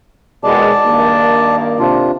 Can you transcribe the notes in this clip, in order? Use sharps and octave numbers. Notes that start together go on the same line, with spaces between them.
D#2 B2 G#3 D5 A5
G2 D#3 A#3
C3 D4 F4